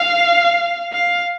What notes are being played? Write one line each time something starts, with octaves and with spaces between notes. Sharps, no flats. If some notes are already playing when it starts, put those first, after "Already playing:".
Already playing: F5
F5